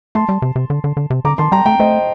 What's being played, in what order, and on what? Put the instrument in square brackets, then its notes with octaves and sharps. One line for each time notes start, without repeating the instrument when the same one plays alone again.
[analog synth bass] A3 [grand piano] A5 C6
[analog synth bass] G3
C3
C3
D3
D3
D3
C3
[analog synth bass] D3 [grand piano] A#5 D6
[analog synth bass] D#3 [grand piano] A5 C6
[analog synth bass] G3 [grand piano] G5 A#5
[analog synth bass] A3 [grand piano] G5 A#5
[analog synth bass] A3 [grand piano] C5 D#5